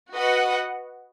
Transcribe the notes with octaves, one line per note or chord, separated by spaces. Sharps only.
F#4 B4 D#5 F#5